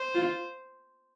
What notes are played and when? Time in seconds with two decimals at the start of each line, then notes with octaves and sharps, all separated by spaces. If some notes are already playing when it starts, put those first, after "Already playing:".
Already playing: C5
0.15 F4